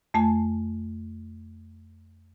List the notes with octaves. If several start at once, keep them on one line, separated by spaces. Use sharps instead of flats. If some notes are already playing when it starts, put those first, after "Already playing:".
F2 A3 G#5 A5